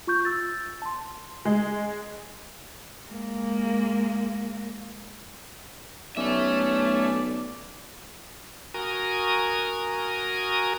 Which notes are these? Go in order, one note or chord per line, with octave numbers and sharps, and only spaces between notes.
F4 C#6 G6
E6 A6
A5 C6
G#3
G#3 A#3
B1 A3 C#4 D5 E5
F#4 A#4 G#5 A#5 D#6